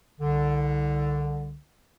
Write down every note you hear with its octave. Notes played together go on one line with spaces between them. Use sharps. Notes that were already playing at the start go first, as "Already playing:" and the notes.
C2 D3